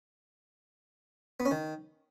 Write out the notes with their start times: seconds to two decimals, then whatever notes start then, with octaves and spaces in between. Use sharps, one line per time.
1.40 B3
1.45 C#4
1.51 D#3